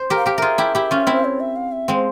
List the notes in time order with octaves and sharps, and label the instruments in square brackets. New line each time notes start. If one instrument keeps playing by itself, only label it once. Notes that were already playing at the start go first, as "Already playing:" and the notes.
Already playing: [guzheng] C5
G4 A#4
[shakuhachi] F5
[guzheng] G4 A#4
[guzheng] F4 G#4 A#4 [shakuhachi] E5
[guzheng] E4 G4
E4 G4
C#4 F4
C4 E4
[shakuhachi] C#5
E5
F5
E5
[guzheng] G#3 C4 [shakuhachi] F5